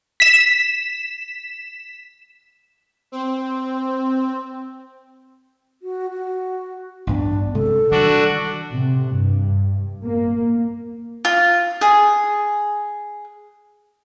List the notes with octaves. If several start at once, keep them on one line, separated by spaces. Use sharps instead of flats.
B6 E7
C4
F#4
F#4
A1 G2 B3 D4
C3 G#3 A4
D#3 E3 G3 D4 F#4
C3
G2
A#3
F4
G#4